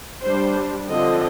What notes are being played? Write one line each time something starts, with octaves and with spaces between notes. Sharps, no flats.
G3 D4 C5
D3 F3 C4 D#5